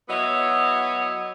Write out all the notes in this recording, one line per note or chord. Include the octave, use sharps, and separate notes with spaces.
F#3 B3 E4 C#5 D#5